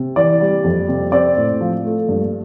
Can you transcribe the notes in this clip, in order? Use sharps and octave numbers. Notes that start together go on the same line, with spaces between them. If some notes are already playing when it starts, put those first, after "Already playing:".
Already playing: C3
E3 D5
G3
F2
C3
C4 D5
A2
F3
A3
G2